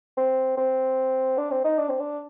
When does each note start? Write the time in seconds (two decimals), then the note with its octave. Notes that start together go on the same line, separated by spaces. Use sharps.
0.17 C4
0.57 C4
1.38 D4
1.51 C4
1.65 D#4
1.78 D4
1.89 C4
2.00 D4